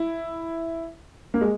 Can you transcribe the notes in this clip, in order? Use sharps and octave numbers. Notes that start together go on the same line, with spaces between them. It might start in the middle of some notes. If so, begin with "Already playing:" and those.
Already playing: E4
A#3
G#3